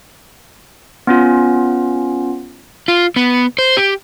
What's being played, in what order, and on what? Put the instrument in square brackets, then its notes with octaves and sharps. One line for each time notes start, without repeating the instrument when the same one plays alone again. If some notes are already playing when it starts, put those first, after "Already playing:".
[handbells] B3 C#4 F4
[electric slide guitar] F4
B3
C5
G4